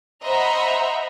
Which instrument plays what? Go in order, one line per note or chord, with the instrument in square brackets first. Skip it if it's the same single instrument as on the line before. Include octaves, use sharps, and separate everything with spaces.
[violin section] C5 D#5 E5 F#5 A#5 B5